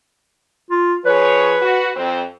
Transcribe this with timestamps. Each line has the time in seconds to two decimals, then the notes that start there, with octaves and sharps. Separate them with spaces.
0.70 F4
1.05 F3 G#4 B4 C#5
1.61 F#4
1.95 F2 C4